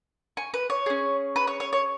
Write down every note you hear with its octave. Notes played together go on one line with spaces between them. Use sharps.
G#5 C#6
B4
C#5
C#4 G#4
B4
C#5
C#5
C#5